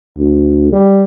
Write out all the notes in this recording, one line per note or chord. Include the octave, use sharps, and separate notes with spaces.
D2
G3